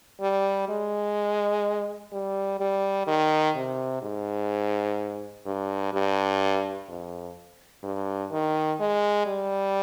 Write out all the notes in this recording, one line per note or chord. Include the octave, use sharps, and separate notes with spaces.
G3
G#3
G3
G3
D#3
C3
G#2
G2
G2
F2
G2
D#3
G#3
G3